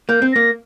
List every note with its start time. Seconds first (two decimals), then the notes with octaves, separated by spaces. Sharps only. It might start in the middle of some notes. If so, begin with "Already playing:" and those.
0.09 A#3 G6
0.22 C4
0.33 A#3 A#6